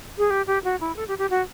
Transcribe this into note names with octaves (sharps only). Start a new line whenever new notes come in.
G#4
G4
G4
F#4
E4
A4
G4
G4
F#4